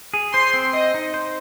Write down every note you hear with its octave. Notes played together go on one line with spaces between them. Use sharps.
G#4
C5 C6
C4
C5 D#5
D#4
C5